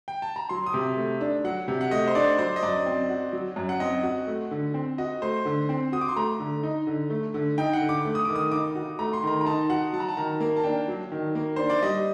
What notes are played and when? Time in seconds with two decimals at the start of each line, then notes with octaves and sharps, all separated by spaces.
0.08 G5
0.22 A5
0.36 A#5
0.49 F#3 C6
0.66 D#6
0.73 C3 D6
0.97 A3
1.21 D4
1.44 F#3 F#5
1.68 C3
1.81 F#5
1.91 A3 D#5
2.08 C5
2.15 D4 D5
2.39 F#3 C5
2.56 D#5
2.63 F#2 D5
2.86 C4
3.09 F#4
3.33 F#3
3.56 F#2
3.69 F#5
3.80 C4 D#5
4.03 F#4
4.27 A3
4.51 D3
4.74 C4
4.98 F#4 D#5
5.22 A3 C5
5.45 D3
5.69 C4
5.92 F#4 D#6
6.01 D6
6.08 C6
6.16 A3 A#5
6.40 D3
6.63 D#4
6.87 D3
7.10 A3
7.34 D3
7.58 D#4 G5
7.73 F#5
7.81 D3
7.89 D6
8.05 A3
8.15 D#6
8.25 D#3 D6
8.36 D#6
8.52 D#4 D6
8.75 F#4
8.99 A3 A#5
9.13 C6
9.23 D#3 A#5
9.41 A#5
9.46 D#4 A5
9.69 F#4 F#5
9.93 F#3 A5
10.00 A#5
10.09 A5
10.17 D#3 A#5
10.40 A#3
10.56 A5
10.64 D4 G5
10.88 F#3
11.12 D#3
11.35 A#3
11.56 D4 C5
11.70 D5
11.82 G3 D#5